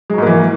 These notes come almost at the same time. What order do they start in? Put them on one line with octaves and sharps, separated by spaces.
G#3 F#3 G#2 A#3 E3